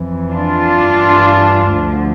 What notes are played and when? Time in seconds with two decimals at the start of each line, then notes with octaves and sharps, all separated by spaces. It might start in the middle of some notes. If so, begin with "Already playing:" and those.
Already playing: F2 E3
0.31 D4 F4
0.78 G2 E3
1.70 D2 D3 F3